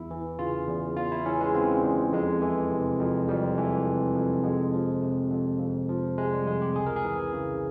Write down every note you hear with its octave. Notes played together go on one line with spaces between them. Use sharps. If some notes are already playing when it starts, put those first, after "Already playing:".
Already playing: E2 E4
E3
C#3 F4
E2
E2 F4
E4
E3 C#4
G#3
C#3 C4
E2
F2 G#3
E3
C3
F2
F2 G3
E3
C3
F2
F2 G#3
F3
C3
F2
F2
F3
C3 G#3
G3
F2 G#3
G4
C#2 G#4
A#4
G#4
E3
C#3